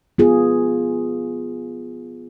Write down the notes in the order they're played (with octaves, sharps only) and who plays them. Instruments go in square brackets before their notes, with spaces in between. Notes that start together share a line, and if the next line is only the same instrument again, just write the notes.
[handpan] B3 F4 G#4